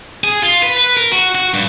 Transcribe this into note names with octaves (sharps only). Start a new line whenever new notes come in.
G#4
F4
B4
B4
A#4
F#4
F#4
G2